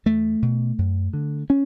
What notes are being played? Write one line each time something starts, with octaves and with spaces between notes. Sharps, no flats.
E2 A3
B2
F#2
D3
C#4